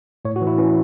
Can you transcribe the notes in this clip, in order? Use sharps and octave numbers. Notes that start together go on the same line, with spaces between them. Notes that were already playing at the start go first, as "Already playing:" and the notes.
A2 C#5
F#4
E3
E4
E3 C#4